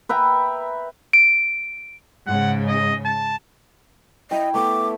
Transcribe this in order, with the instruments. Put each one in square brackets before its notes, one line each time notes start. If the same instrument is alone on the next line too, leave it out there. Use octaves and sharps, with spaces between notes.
[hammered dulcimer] B4 E5 G5 A#5
[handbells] D7
[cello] G#2 C#3 [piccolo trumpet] F#5
[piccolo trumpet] D#5
A5
[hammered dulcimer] E4 E5 G5 [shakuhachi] D#5
[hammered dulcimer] A3 B3 A4 [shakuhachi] D6